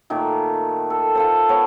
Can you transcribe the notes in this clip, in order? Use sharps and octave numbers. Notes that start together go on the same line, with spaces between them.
A#2 D#3 A3 A#5
A4
F4 A4 C5
B3 C#5